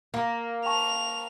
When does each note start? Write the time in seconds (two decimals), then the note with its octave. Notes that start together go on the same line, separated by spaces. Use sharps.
0.14 A#3
0.65 G5 A5 C#6 F7